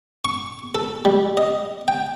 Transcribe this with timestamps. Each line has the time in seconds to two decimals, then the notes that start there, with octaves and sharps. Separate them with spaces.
0.25 C#6
0.75 A4
1.05 G3
1.37 D#5
1.88 G5